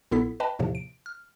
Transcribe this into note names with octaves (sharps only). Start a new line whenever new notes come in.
B1 A#2 B3 E4 A4 B6
B4 D#5 G5 A5 B5
D#2 A2 C3 F3
D7
F6